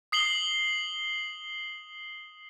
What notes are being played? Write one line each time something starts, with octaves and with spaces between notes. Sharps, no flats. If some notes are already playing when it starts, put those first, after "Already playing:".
D#6 C7 F#7 G7